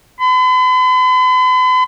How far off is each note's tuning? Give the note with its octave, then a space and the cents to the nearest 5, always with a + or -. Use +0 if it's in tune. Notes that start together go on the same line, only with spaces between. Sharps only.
B5 +45